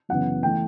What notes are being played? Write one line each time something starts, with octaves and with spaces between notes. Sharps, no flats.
F#2 C#3 E3 B3 F#5
E3 A3 G5